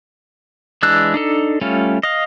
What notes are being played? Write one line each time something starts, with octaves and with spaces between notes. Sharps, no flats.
E3 G#3 D4 E6 F#6
D4 D#4 A4
G3 A3 C#4 F4
D#5 F5